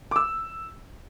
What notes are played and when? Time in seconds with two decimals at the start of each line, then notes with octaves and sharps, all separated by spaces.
0.11 D6
0.16 E6